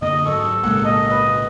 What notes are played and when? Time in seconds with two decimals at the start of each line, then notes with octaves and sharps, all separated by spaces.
0.02 F#2 D3 A#3 D#5
0.25 G#2 F#3 A4 C#6
0.63 B1 A2 C#3 G#3 A#3 F#5
0.85 D#5
1.11 B4